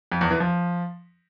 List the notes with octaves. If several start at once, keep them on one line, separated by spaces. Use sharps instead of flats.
F2
E2
E3
F3